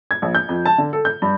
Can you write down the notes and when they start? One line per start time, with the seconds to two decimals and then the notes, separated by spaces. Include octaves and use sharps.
0.11 G#6
0.22 A#1
0.35 G6
0.49 F2
0.66 A5
0.78 D3
0.93 A4
1.05 G6
1.22 G2